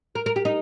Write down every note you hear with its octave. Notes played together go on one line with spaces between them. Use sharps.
A#4
A#4
G4
D#4